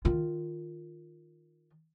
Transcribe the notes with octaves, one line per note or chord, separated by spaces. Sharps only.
D#3 F4